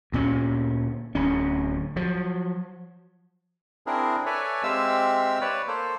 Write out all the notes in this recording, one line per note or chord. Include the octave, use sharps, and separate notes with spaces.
D2 A#2 C#4
D1 D2 C#4
F3 F#3
C4 D4 E4 G#4 A#4
A4 B4 C#5 D5 E5 G#5
G#3 C4 G4 E5 F5 E6
B4 C#5 D5
A#3 A4 C5